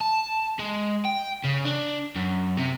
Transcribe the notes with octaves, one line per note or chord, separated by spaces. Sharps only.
A5
G#3
G5
C#3
D4
F#2
C3